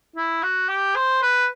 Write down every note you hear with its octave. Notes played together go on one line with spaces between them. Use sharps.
E4
F#4
G4
C5
B4